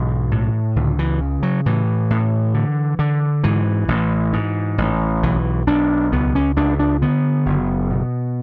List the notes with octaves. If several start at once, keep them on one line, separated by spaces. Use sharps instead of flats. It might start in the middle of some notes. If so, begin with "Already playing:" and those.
Already playing: B1 G#2 E3
A2
C#2 D3
E3
C#3
F#3
A2 E3
A2
D3
D3
G#2 E3
A1
G#2
A1
B1 E3
B1 D4
C#2 B3
C#4
C#2 D4
D4
D3 B3
F#1
B2